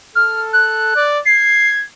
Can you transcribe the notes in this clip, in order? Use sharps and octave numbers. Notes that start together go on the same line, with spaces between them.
A4 F6
F#6
D5
G#6 C7